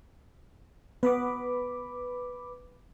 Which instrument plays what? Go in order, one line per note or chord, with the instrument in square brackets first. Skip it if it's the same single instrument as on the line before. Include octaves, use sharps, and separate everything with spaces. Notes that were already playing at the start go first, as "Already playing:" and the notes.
[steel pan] B3 [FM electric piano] B4 B5 D6